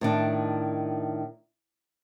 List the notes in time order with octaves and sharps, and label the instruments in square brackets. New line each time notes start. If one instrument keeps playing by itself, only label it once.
[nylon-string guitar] A2 D#3 D4